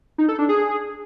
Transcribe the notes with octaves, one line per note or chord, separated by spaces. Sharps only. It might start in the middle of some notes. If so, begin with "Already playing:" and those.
D#4
A4
D4
G#4